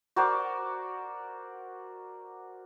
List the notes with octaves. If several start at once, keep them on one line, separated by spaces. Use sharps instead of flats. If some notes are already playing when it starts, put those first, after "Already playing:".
F#4 A#4 C5 D5